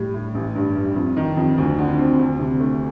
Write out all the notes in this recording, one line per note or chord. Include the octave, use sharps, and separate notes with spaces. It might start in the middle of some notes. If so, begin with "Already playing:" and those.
Already playing: A2 G3
A2
A1
G2
G3
F2
D#3
F2
D2
D3
C4
D2
C3
A3